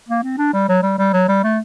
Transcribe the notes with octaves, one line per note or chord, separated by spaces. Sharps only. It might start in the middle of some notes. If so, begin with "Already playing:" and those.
A#3
C4
D4
G3
F#3
G3
G3
F#3
G3
A3